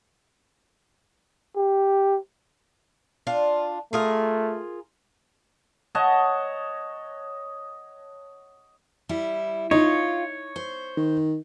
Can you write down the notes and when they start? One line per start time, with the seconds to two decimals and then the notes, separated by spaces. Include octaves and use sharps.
1.57 G4
3.27 D4 F4
3.93 A3 F4 G#4 A#4
5.95 C#5 D#5 F#5 A5
9.09 G3 E4
9.71 D#4 F4 C#5
10.56 C5
10.97 D#3